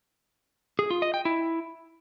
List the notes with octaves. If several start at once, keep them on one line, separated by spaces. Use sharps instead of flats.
G#4
F4
D#5
G5
E4